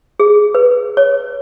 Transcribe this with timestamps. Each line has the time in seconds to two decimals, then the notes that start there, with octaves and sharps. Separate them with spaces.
0.20 G#4
0.55 B4
0.97 C#5